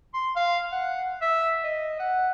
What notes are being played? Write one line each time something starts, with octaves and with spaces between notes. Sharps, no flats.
C6
F5
F#5
E5
D#5
F#5